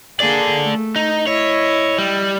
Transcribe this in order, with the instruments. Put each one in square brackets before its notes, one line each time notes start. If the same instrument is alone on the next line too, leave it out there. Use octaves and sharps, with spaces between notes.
[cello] A#3 G#4 [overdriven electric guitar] A4 D5
[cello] A3
[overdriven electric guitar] D#4
[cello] E4 D#5 [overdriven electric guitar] C#5
[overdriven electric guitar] G3